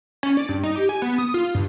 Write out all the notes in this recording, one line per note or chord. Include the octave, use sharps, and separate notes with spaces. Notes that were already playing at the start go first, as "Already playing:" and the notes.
C#4
D5
G2
D#4
G4
G#5
B3
D#6
F4
G2